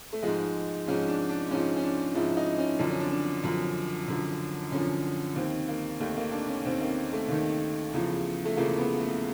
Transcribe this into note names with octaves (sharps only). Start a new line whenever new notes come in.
A3
G#2 F3 G#3
G#2 F3 C#4
D4
D4
G#2 F3 C#4
C#4
D4
G#2 F3 E4
D#4
C#4
F#2 D3 F3 D4
C#4
D4
D4
F#2 D3 F3
F#2 D3 F3
F#2 D3 F3 C#4
D#2 D#3 C4
A#3
D#2 D#3 A3
A#3
D4
C#4
D#2 D#3 C4
A#3
A3
D#2 D#3
E2 C#3 F3
A3
E2 C#3 F3 A#3
B3
A3